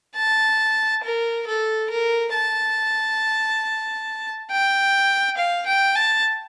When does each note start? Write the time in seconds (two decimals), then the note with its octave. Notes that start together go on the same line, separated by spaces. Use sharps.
0.16 A5
1.04 A#4
1.47 A4
1.90 A#4
2.34 A5
4.51 G5
5.37 F5
5.67 G5
5.95 A5